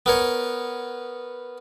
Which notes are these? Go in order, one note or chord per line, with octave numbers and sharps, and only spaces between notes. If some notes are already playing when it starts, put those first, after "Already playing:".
B3 A#4 C#5